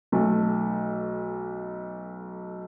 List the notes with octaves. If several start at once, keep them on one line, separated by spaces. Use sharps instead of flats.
B1 A3